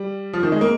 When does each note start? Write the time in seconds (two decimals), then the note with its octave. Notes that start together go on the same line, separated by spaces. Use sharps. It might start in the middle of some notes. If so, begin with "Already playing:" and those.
Already playing: G3
0.33 F3
0.43 D#3
0.52 G#3
0.61 A#3